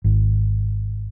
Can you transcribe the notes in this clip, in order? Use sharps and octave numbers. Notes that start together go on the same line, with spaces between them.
G#1